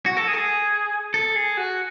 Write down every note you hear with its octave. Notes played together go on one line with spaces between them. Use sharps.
F#4
A4
G#4
A4
G#4
A4
G#4
F#4